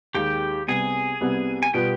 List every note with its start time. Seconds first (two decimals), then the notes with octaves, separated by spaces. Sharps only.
0.15 D#2 D#3 G#3 G4 G5
0.68 C2 C3 G3 B3 G#4 G#5
1.21 C2 C3 G3 B3
1.63 G#5
1.73 B2 G3 B3 F4 G4 G5